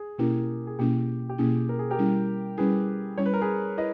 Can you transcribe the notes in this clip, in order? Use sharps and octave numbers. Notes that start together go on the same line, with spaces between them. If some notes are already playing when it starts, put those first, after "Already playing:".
Already playing: G#4
B2 A#3 C#4 E4 G4 A#4
G#4
B2 A#3 C#4 E4 G4
G4
B2 A#3 C#4 E4 G#4
A#4
G#4
G4 A#4
G3 C#4 E4
G3 C#4 E4 G#4 B4
G3 C#4 E4 C#5
B4
A#4
G#4 B4
E4 B4 D#5